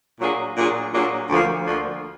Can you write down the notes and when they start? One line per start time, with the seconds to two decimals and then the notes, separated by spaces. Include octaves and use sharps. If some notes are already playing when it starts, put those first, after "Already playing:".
0.20 A#2 F#3 A#3 D4 G#4
0.57 A#2 F#3 A#3 D4 G#4
0.94 A#2 F#3 A#3 D4 G#4
1.30 D2 D3 F3 A#3
1.67 D2 D3 F3 A#3